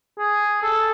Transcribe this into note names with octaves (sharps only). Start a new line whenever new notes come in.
G#4
A4